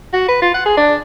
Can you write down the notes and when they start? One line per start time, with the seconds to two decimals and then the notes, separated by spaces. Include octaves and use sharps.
0.13 F#4
0.28 B4
0.42 F4
0.54 F#5
0.66 G#4
0.77 D4